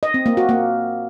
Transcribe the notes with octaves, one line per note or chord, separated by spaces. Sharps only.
D#5
C4
A#3
F#4
A#3